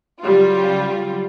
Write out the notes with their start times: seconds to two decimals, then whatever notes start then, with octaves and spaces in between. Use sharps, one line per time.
0.22 C#3 F#3 G3 F4